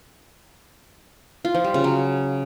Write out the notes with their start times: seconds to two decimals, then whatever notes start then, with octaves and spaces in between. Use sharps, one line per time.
1.45 F4
1.54 F3
1.64 G3
1.74 C#3
1.84 F#3